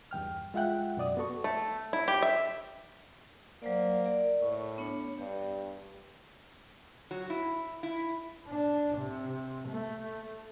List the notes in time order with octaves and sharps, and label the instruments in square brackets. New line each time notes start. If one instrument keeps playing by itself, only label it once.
[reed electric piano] E2 G2 G5 F6
G#3 F4 E5 F#5 G5 F#6
F#2 B2 D5 D#6
B3 F#4 A4 C#6
[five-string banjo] A3
E4
G4
E5
[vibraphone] F#3 C5 D5 [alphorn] A#3
[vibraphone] A#4 D5
[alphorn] A2 [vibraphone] C#6
[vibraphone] B3 D4 C#5
[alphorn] G2 [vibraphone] G4
[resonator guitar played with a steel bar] F#3
E4
E4
[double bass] D4
C3
A3